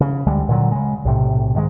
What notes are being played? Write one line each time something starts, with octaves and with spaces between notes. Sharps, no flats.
C#3
D2 D3 G3 G#3
A#2 D3 F#3
C#3 G#3
B1 A2 C3
G#2 D#3 F3 G#3